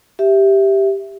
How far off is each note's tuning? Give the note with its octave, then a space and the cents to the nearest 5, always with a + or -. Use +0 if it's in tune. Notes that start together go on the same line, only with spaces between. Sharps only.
G4 +0 E5 +0